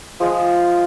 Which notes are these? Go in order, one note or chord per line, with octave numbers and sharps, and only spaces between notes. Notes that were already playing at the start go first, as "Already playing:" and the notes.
F3 G#3